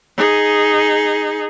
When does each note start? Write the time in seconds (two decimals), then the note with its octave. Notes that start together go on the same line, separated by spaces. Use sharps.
0.17 D#4 G#4